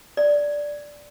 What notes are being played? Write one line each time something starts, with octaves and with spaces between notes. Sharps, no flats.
D5